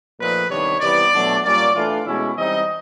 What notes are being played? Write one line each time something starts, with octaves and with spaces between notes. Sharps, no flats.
A#2 F3 A3 C4 D#4 B4
C3 D#3 G3 B3 D4 C#5
C3 E3 G3 B3 D5
B2 F#3 A3 D4
A#2 G3 A#3 C#4 D5
E3 A3 D4 F4
B2 G#3 C#4 E4
E3 G3 C4 D#4 D#5